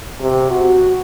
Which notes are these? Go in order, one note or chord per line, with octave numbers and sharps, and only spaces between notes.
C3
F#4